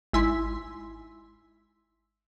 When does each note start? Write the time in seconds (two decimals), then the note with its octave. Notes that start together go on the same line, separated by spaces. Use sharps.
0.13 G#1 E4 G#5 C6